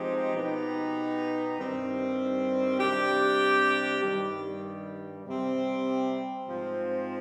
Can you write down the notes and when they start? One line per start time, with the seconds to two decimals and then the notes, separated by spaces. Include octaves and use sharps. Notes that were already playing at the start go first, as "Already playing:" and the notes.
Already playing: F3 G#3 C4 D#4 G4
0.34 B2 B3 D#4 G4
1.57 G2 D#3 G3 C4
2.80 C3 G3 D4 G4
4.03 G2 D#3 G3
5.25 C3 G3 C4
6.48 G#2 F3 C4